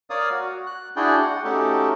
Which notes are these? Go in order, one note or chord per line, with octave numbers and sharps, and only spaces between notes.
A#4 C#5 D5 F5 D#6
F#4
F#6
D4 E4 F#4 G#4 D5 G5
F#5
A3 C#4 D#4 F#4 G4 A4